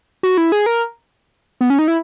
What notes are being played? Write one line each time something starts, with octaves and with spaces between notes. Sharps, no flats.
F#4
E4
G#4
A#4
B3
C#4
D#4
E4